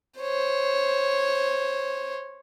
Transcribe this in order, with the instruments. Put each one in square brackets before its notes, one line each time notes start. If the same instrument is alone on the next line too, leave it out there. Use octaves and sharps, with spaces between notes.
[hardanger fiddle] C5 C#5